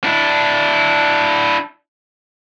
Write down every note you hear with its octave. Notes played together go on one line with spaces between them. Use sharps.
D4 E4